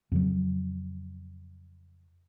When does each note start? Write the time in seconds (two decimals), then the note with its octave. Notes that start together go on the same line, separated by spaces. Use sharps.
0.12 F2 C#3 F#3